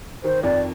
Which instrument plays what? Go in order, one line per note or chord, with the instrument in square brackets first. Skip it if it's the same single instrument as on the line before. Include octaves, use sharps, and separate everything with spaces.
[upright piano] D#3 [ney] C5
[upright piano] F2 [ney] D5